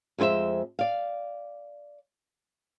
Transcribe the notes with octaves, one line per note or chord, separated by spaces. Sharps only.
F2 G#3 E4 C5 E5
D5 F5